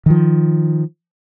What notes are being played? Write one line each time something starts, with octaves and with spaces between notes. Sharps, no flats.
D#3 F3